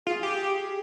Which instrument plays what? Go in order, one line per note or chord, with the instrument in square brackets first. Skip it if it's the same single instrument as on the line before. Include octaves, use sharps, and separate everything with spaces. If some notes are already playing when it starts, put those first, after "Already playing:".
[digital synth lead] F4 [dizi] G#4
[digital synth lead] G4